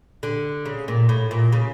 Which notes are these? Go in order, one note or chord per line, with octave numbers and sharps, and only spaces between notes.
D3
C#3
A#2
A2
A#2
C#3